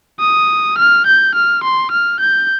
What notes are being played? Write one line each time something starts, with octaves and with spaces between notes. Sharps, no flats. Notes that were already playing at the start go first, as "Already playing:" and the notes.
D#6
F6
G6
F6
C6
F6
G6